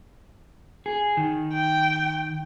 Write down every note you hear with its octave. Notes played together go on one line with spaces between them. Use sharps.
G#4
D#3
G5